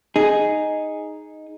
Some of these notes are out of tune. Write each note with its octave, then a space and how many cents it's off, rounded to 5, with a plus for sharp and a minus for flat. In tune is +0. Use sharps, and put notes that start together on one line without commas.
D#4 +0 G#4 +0